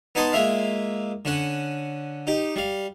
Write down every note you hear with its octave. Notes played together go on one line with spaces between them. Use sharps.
B3 D#4 G#5 A5 C6 D#6
G#3 A#3 F4 E5 F5
D3 C#4 F#5
D#4 G4
G3 F5